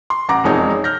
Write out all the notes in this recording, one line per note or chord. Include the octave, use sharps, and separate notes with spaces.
C6
A1 F#5 A#5 D6 A#6
E1 F2 G#3 D#4 C#5
F6 G6 A#6